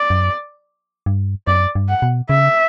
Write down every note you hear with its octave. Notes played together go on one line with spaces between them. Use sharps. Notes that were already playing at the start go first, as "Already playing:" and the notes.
Already playing: D5
F#2
G2
F#2 D5
G2
F#5
B2
C#3 E5